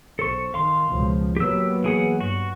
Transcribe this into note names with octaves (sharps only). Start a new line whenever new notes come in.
B1 A4 C5 C#6
D#3 F5 C6
C#2 B2 F3
F#3 A#3 B3 G4 E6
E3 G#4 F#5
G2 F#4